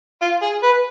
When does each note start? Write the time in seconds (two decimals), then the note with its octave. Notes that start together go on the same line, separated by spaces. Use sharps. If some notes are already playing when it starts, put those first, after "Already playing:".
0.21 F4
0.42 G#4
0.63 B4